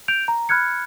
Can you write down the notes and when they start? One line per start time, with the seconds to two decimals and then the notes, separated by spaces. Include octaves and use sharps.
0.08 G6 D7 F7
0.28 A#5
0.49 B5 F6 F#6 G#6 C#7